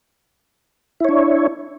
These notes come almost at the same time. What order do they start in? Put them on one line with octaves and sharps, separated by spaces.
E4 C#5 D4